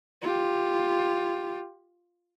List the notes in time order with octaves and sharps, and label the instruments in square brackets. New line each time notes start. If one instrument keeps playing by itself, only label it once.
[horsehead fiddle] F4 G4